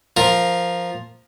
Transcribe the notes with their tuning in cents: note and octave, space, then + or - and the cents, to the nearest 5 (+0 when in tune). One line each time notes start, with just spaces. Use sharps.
F3 +0 A#4 +0